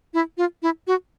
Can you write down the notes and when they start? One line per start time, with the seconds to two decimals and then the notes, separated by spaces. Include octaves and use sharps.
0.14 E4
0.38 F4
0.62 E4
0.87 F#4